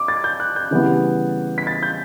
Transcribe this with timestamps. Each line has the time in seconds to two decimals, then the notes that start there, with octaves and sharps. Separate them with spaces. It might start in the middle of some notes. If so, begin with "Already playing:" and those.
Already playing: D6
0.08 A6
0.24 G6
0.40 F#6
0.56 G6
0.71 C#3 E3 G3 B3
1.58 B6
1.67 A6
1.83 G6